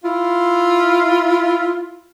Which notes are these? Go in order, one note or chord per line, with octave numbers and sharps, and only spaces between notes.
E4 F4